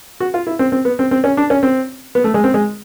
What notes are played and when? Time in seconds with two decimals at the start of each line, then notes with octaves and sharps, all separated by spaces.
0.20 F#4
0.34 F4
0.47 E4
0.59 C4
0.72 C4
0.85 B3
0.99 C4
1.11 C4
1.24 C#4
1.37 D4
1.50 C#4
1.63 C4
2.15 B3
2.24 A3
2.34 G#3
2.44 C4
2.54 G#3